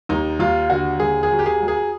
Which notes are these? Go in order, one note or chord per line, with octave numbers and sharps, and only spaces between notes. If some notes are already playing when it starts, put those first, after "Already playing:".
D#2 D#4
D#2 F4
D3 F#4
D#2 G#4
G#4
F#3
G4
G#4
F#3
G#4